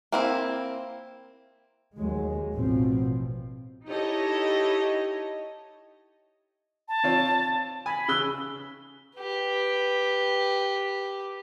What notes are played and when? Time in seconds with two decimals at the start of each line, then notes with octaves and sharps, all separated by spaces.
0.12 A#3 C4 E4
1.96 D#2 F#3 G#3
2.53 A1 B2 F3 C4
3.88 D#4 E4 G4 A4 C#5 D#5
6.88 A5
7.04 C4 F4 C#5
7.86 G#5 B5
8.08 C#3 E6 F#6 G7
9.18 G4 B4